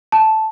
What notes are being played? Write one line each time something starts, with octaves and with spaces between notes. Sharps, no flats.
A5